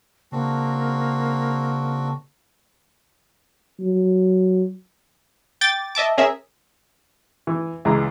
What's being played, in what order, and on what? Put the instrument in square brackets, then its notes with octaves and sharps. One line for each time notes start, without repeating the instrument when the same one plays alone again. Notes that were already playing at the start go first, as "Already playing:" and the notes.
[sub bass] C#3 [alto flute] A#3 [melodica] C4 D4 F#4
[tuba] F#3
[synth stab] G5 D6 A6
D#5 E5 A5 D6
C#4 G#4 A#4 E5
[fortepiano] E3
C#2 E3 G#3 A#5